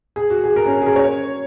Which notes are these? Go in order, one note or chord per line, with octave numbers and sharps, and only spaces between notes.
G#4
F#4
G#4
A#4
C#4
G#4
A#4
C#5